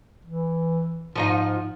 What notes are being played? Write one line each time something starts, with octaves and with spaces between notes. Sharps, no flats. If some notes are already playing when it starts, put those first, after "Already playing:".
E3
G#2 F3 D#4 F4